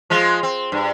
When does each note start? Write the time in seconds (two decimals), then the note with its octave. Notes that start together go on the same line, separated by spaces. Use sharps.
0.10 F3 G#3 F4
0.43 C4
0.72 G2